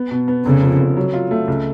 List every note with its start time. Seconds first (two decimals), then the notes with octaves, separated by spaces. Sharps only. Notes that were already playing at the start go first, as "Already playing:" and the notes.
Already playing: B3
0.11 B2
0.28 B3
0.45 F1 C#3
0.62 F3
0.79 F1
0.97 F#3
1.14 F4
1.31 A3
1.48 C#2